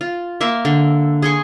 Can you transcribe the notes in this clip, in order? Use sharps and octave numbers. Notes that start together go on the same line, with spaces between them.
F4
A#3 E5 C6
D3
G#4 C6 C#6